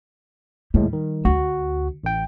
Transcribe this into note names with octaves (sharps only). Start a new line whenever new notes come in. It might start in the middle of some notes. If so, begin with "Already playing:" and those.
D#2 A2 G3 G#3
D#3
D2 F#4
A1 G5